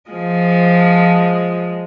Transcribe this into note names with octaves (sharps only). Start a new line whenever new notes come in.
F3 G#3